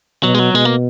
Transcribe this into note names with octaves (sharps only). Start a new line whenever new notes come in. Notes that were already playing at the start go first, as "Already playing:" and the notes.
B2 F#3
G#3
F#3
B2 G#3
A#3